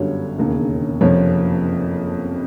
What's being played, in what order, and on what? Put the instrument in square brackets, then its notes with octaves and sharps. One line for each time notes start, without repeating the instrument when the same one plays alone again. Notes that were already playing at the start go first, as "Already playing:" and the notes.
Already playing: [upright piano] G1 F#2 D3 G3 C#5
E1 D#2 C#3
F#1 F2 C3 F3 C#5